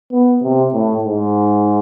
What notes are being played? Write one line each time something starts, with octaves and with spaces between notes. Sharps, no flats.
B3
C3
A2
G#2